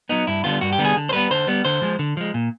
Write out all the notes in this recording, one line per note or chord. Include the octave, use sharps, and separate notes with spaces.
F#3 B3 D#4
G2 E4
D3 G3 B3 F4
G2 F#4
G4
D3 G3 B3
G#4
D3
C5
G3 B3 B4
D3 C5
G3 B3
D3 C5
F3 G#3
D3
F3 G#3
A#2